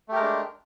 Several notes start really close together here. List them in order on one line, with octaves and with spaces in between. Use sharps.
A3 G4 A#4 G#3 D4